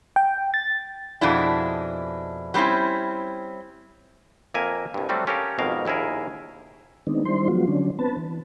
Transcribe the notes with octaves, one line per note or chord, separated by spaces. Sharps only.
G5
A6
F2 B2 G#3 D4 E4
F#3 G3 C4 C#4 E4
F2 A#3 A#4 E5 G#5
C2 G2
F#3 G3 A3 C4 F#4
C#4 G4 A4 A#4 C#5 F5
G#1 F2 B2 A#4 F5
A#1 D#2 E4 G#4 A#4
D#3 G#3 B3 C4 D4 D#4
D#3 G3 D4 E4 C5 C6
F3 F#3 G#3 B3 F4 F#4
D3 F#3 C#4 D4
B3 C4 B4 A5
E3